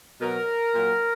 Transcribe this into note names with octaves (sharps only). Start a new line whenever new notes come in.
B2 F#3 A#4
A#2 F#3